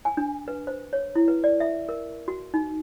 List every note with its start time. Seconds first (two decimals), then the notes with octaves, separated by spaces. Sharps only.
0.05 G#5
0.17 D4
0.48 B4
0.67 C5
0.93 C#5
1.15 E4
1.28 B4
1.44 D5
1.60 E5
1.89 A#4
2.28 F#4
2.54 D#4